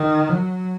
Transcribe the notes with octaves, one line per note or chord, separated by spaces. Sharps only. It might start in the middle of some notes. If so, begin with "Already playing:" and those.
Already playing: D#3
F#3